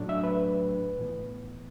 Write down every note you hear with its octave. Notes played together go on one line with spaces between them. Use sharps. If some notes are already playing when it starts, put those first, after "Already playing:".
Already playing: A2 F#3 A3 D4
E5
B4
A2 E3 B3